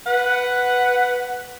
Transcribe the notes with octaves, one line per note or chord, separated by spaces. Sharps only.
B4 F#5